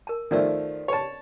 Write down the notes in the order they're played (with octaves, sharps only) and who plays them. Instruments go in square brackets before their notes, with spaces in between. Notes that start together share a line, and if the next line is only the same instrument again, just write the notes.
[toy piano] A#4 A5
[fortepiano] D#3 F3 A3 [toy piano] A#4 D5 E6
[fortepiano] C#5 A5